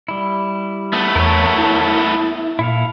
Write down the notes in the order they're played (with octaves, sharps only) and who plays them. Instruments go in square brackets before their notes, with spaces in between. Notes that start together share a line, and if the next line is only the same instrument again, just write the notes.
[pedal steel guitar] G3 E4
[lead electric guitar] A3 B3
[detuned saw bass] E2 [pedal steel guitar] A#4 C#5
[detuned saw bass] E4
[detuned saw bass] A#2 [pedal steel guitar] E4 A4 F5